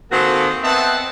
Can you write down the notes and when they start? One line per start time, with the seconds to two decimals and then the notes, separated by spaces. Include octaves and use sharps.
0.11 D#3 A#3 C4 F#4 G#4 A4
0.64 B3 C4 D#5 E5 F#5 A5